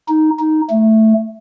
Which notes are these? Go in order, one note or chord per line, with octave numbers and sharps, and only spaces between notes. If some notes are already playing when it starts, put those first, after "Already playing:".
D#4
D#4
A3